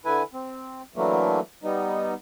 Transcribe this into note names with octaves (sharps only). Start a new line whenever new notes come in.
D3 E4 B4 G#5
C4
D3 E3 F#3 A3 A#3
G3 B3 D#4